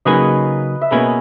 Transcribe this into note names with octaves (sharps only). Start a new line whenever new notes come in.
C#3 F#3 A#3 D#4 G#4 B4 D#5
E5
B2 A#3 C#4 G#4 B4 D#5